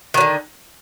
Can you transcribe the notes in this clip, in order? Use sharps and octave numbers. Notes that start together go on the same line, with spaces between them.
D3 D#3 F#3